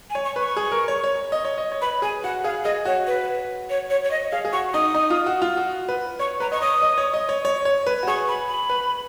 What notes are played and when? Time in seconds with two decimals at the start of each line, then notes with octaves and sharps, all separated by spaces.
0.10 G#5
0.15 C#5
0.25 C#6
0.36 B4 C#6
0.57 G#4
0.72 A#4
0.88 C#5
1.04 C#5
1.32 D#5
1.45 C#5
1.58 D#5
1.72 C#5
1.82 B4 B5
2.02 G#4 G#5
2.24 F#4 F#5
2.44 G#4 F5
2.65 G#4 D#5
2.85 F#4 C#5
3.07 B4
3.70 C#5
3.90 C#5
4.04 C#5
4.11 D#5
4.32 G#4 F5
4.45 G#4
4.53 F#4 C#6
4.74 D#4 D#6
4.95 D#4
5.10 F4
5.26 F#4
5.42 F4
5.57 F#4
5.89 B4
6.19 C#5 C#6
6.40 B4 A#5
6.52 D#5 C#6
6.62 C#5 D#6
6.82 D#5
6.98 C#5
7.14 D#5
7.29 C#5
7.45 C#5
7.65 C#5
7.87 B4
8.03 F#4
8.08 G#4 C#6
8.28 B5
8.48 B5
8.69 B4